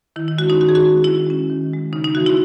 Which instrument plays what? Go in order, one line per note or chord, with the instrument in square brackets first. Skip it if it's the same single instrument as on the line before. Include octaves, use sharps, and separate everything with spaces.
[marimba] D#3 E4
E4
G#3 F#4
C#4
D#4
D#3 F#4
G#4
F#4
G#3 C#4
D#3 E4
G#3 C#4
D#3
G#3 C#4
C#3 D#4
D#4
E3 A#3 F#4
E4